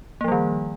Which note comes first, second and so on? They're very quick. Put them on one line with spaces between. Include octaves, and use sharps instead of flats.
A#3 F3 G3 D#3